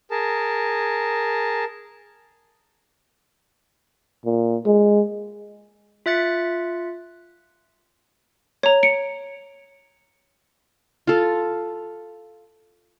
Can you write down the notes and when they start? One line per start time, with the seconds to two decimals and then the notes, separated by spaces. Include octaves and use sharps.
0.11 G#4 A#4 A5
4.25 A#2
4.66 G#3
6.06 F4 E5 F#6 A6 C#7
8.63 C#5 A#5
8.83 C#7 D7
11.07 F4 A4